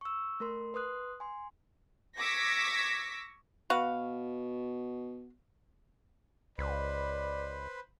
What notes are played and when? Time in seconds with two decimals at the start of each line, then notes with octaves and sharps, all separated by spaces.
0.01 C#6 E6
0.40 A3 A#4 C6
0.74 B4 C6 D#6 F#6
1.20 G#5 C6
2.18 C#6 D6 E6 G#6 A#6 B6
3.70 B2 F#4 B4 F5
6.58 C#2 B4 C5 D5 B5